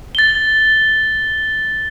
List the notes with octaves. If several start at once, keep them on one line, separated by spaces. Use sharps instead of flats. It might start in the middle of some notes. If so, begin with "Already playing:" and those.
A6 G7